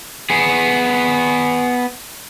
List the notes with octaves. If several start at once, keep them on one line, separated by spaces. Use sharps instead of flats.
B3 G#4